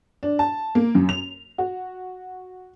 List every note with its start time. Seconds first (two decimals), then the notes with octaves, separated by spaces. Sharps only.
0.23 D4
0.39 A5
0.75 A#3
0.95 F#2
1.09 F7
1.58 F#4